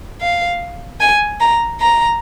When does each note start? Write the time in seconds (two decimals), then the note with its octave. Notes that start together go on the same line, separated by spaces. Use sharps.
0.21 F5
1.00 G#5
1.40 A#5
1.81 A#5